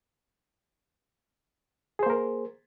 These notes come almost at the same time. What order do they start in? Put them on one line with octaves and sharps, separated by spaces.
G#4 C5 A#3 A#4